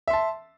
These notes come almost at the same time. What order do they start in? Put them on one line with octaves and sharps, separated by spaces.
E5 C6 A5